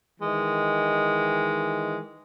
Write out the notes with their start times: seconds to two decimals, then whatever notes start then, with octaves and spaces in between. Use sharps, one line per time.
0.21 D#3 E3 G#3